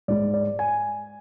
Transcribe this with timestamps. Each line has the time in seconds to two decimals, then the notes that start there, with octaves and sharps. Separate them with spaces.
0.08 G#2 G#3 D5
0.34 D5
0.59 G#5